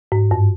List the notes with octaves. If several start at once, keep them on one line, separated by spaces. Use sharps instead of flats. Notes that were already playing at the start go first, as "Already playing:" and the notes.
G#2
G2